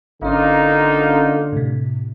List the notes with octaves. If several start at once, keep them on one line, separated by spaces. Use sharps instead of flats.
G#1 D3 A#3 C#4 D#4 F4
A2 C3